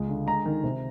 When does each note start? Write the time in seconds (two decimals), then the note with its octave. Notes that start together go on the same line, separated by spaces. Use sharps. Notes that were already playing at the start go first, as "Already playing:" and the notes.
Already playing: C#2 G#3
0.08 D3
0.27 G#3 A#5
0.46 D#3
0.64 C3